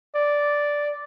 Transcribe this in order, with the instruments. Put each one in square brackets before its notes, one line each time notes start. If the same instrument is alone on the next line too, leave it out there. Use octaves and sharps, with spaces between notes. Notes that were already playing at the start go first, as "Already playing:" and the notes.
[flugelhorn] D5